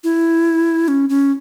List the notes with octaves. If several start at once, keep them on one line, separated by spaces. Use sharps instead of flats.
E4
C#4
C#4